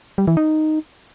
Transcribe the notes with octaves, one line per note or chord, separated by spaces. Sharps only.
G3
E3
D#4